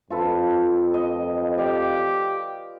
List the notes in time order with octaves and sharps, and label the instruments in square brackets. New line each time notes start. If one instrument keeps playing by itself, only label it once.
[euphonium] F2 [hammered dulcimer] F4 A4 B4
[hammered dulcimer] D#5
[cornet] G4 [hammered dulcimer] D5 F5